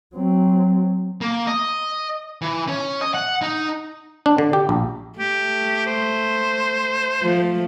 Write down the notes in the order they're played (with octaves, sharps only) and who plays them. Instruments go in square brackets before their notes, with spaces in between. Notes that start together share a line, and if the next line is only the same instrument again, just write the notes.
[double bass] F#3 C4
[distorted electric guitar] A#3
D#5
E3
C#4
D#5
F#5
D#4
[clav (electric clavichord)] D4
D3
G4
A#1
[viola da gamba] A3 [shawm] G4
[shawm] C5
[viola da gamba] F3 A3